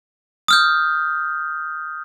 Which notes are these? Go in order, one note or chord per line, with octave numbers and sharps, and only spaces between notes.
D#6 F6 G6